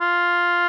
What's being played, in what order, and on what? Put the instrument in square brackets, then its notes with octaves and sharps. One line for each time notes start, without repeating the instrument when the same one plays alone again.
[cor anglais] F4